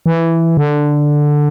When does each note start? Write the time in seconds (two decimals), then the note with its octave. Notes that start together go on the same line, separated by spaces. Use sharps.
0.06 E3
0.57 D3